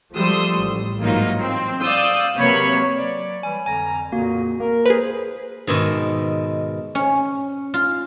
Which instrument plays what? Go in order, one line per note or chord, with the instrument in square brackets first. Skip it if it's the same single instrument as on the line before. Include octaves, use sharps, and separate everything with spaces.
[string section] F3 G3 A3 C6 D#6 E6
A1
G#2 E3 F#3 A#3 D#4 F4
C4
D5 F5 D#6 E6 G6
C3 F#3 A#3 B4 C#5 B5
[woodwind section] F#3 D5
[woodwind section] E3 G3 [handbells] G#5
[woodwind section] F2 D3 A#5 [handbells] G#5
[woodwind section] F2 A#2 C#3 [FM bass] A#3 [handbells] F#4
[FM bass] A#3 [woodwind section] A#4
[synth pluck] G#4 B4 [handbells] C5
[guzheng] G#2 B2 D#3 E5
C#4
F4